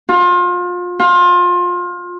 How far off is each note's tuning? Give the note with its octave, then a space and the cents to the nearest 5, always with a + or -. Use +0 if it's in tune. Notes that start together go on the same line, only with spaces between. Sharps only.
F4 +30
F4 +25